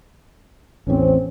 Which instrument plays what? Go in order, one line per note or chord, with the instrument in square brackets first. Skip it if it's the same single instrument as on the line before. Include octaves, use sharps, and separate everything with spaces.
[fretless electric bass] A1 E2 [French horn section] C4 C#4